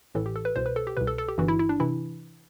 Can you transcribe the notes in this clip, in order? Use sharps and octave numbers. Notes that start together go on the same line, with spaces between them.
A1 A2 E3 A4
G4
A4
B4
C2 B2 C5
B4
A4
G4
C2 B2 B4
A4
A4
G4
G1 G2 E3 F#4
E4
E4
D4
C3 E3 E4